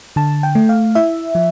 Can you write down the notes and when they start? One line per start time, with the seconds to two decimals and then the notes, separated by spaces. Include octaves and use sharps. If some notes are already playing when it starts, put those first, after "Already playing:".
0.16 D3 A5
0.43 G5
0.55 A3
0.69 F5
0.95 E4 E5
1.35 F3